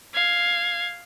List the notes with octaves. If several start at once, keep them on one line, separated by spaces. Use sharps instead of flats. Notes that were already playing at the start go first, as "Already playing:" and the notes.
F5 G#6